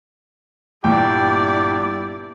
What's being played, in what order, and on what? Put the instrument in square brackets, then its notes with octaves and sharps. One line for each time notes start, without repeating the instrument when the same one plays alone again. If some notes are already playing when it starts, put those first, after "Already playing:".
[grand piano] G1 A#2 G5 [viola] E4 D5 [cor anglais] G4